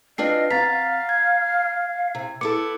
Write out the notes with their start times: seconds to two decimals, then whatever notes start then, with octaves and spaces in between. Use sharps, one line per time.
0.18 C4 D4 F4 B4 D#5 A5 C7
0.50 C4 F5 A#5 A6 B6
1.09 G#6
2.15 C3
2.41 B3 E4 A4 D6 C#7